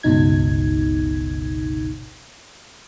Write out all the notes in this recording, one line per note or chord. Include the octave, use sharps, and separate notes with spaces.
G1 C#2 B2 D#4 G#6